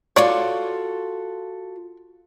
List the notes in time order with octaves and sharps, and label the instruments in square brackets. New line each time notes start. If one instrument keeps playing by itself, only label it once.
[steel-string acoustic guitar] F4 F#4 A4 [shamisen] C#5 D5